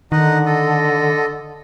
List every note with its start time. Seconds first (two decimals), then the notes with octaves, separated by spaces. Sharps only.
0.12 D3 D#3 D#4 D#5 F#5
0.46 A4 D#5